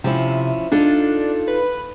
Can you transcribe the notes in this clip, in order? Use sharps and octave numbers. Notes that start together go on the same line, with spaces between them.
C3 F3 C#4 E4
D4 D#4 F4 A4
B4